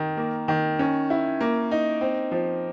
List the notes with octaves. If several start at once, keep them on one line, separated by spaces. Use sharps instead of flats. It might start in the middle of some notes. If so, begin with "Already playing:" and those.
Already playing: D#3
A#3
D#3
C#4
E4
A#3
D#4
C4
F3